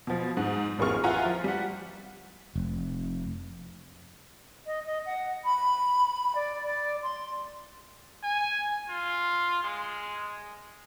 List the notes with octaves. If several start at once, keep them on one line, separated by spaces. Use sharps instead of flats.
B2 F3
G#2
A1 F2 A#3 G#4 C#6 F6
F4 E5 F#5 G#5 A#5
F3
G3 F#5
F1
D#5
D#5
F#5
B5
D5
D5
C6
G#5
F4
G#3